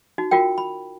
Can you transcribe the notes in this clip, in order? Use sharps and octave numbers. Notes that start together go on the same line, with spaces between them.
D#4 F#4
F4 F#4 A#4 G5
B5